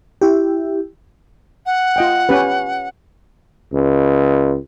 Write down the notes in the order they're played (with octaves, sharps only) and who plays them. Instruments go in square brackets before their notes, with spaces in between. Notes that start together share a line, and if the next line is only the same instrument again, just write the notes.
[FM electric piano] E4 G4
[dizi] F#5
[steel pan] F4 D#5 G5
C#4 G4 B4
[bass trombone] C#2